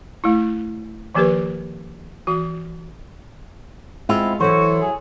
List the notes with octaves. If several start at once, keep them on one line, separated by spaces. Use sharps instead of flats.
A3 E4
D#3 F3 A#3 G4 A#4 B4
E3 F#4
G#3 B3 C4 E4 F4
E3 F#3 E4 F#4 A4 C5
G#4